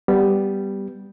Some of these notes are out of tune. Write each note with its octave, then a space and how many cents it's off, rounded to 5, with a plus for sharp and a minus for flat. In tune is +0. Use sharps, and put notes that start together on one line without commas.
G3 +0 B3 +5